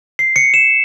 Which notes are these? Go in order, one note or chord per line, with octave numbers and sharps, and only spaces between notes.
C7
C#7
E7